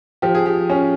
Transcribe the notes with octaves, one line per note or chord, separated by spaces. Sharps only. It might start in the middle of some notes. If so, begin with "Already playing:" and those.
F3 G4
G#4
G4
C#4